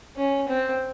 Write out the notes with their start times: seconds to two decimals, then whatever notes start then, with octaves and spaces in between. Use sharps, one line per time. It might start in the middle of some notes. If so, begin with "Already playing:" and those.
0.17 C#4
0.48 C4